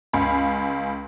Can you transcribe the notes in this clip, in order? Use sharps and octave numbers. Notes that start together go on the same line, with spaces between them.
C#2 F5 G#5 B5